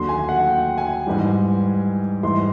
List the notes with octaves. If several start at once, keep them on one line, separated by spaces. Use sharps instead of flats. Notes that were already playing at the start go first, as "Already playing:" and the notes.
Already playing: D#2 D3 F#3 C6
G#5
F#5
G5
G#5
G#2 E3 G3
G#2 E3 G3 C6